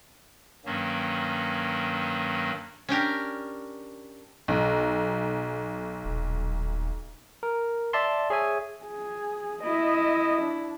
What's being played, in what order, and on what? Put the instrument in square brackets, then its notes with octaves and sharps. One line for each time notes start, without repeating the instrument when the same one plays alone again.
[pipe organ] G2 D#3 F#3 A#3 C#4
[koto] C#4 D4 G4 A#4
[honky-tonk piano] B1
[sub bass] D#1
[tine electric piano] A#4
D5 E5 A5 C6
G#4 C#5 E5 G#5
[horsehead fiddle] G#4
[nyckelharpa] E4 [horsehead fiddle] D#5 E5
[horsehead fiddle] D4